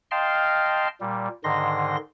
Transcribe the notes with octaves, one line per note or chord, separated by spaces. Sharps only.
D#5 F5 G5 A5 C6 F6
A#2 G3
G#2 D3 D#3 C6 A#6